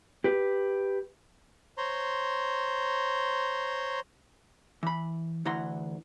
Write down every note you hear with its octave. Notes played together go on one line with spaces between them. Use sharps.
G4 B4
C5 C#5 A#5 C6
E3 B5
D2 E3 E4 F#5 A#5 C6